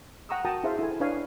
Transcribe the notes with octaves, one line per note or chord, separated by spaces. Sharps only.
F#5 G5 A#5 C#6 D#6 E6
F#4 A#4 G5 A5 A#5 D#6
E4 G#4 C5 E5 F5
E4 A4 G#5
D4 B4 C#5 F5 G#5 B5